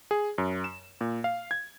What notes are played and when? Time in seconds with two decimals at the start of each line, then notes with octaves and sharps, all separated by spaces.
0.11 G#4
0.38 F#2
0.64 E7
1.01 A#2
1.24 F5
1.51 G#6